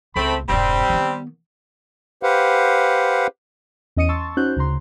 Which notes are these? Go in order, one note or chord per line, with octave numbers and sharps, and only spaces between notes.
C#2 A3 C4 B5
E1 G2 G3 C4
D#3 B3
G4 B4 C5 F5 F#5
E2 C#4 D#5 D#6 C#7 D#7
A5 C6 C#6 E6 A6
C#4 D#4 F#4 C5 F#6 G6
D2 C#3 A#5 C6